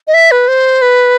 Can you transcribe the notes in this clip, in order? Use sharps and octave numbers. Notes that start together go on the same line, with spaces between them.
D#5
E5
B4
C5
B4